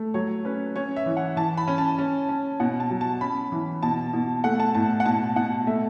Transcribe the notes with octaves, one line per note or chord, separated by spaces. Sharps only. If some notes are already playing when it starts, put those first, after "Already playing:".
Already playing: A3
F#3 C#5
C#4 B4
C#4 C#5
E5
E3
F#5
E3 A5
B5
C#4
A5
C#4
C#4
B2 F#5
A5
F#3
A5
C#4 B5
E3
B2 A5
B2
A3 F#5
A5
A2 A5
F#5
B2 A5
B2 F#5
A3 E5